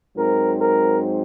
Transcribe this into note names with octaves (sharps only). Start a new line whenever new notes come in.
G#2 F#3 C4 A#4
A#4